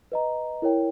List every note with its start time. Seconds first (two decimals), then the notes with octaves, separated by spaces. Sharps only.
0.12 B4 D#5 A#5
0.62 E4 A#4 C#5 G5